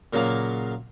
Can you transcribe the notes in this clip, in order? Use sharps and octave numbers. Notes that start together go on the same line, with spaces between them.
A#2 C#3 F#3 A#3 A#5